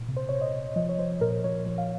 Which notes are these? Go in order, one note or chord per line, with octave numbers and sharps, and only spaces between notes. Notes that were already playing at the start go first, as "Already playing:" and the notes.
Already playing: A#2
C3
C5
C3 C#5
D#5
C3
F3 D#5
C#5
F3 C5
A#2 A#4
F3 C#5
F3
F5